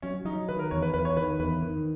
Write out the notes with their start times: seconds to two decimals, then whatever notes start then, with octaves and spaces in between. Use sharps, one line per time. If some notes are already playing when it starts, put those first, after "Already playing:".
0.02 F#3 C#4
0.25 F#3 D#4
0.49 D#3 B4
0.59 A#4
0.71 E2 C#5
0.82 B4
0.94 E2 B4
1.05 C#5
1.17 D#3 B4
1.40 E2 B4
1.63 D#3